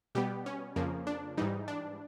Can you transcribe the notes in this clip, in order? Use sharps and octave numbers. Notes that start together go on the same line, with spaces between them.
B2 G3 B3 G4
C#4
F2 C#3 F3 A#3
D4
G#2 E3 G3 D#4
D4